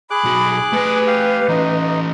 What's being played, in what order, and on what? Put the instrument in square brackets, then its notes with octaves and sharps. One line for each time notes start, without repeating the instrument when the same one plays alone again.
[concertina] G#4 D6 F#6 [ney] B5
[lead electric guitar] B1 F#4
[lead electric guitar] A3 G#5 [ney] B4
[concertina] G4 F5
[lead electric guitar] E3 C#4 [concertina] D#4